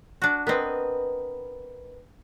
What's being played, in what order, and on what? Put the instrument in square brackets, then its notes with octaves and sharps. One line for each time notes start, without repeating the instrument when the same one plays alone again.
[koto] D4 F#4
[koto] B3 C4 [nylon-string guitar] A#4 B4 D#5